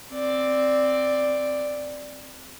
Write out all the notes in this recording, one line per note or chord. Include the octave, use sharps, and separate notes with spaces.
C4 D5